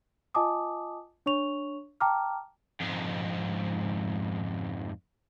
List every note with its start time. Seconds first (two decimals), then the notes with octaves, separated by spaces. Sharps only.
0.34 F4 D#5 G#5 A5 D6 D#6
1.26 D4 C#5 C#6 F7
2.00 G5 A5 A#5 D6 F6
2.80 F2 G#2